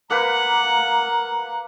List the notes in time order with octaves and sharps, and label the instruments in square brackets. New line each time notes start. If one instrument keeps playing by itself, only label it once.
[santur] A#3 A#4 B4 [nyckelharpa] F#5 [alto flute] A#5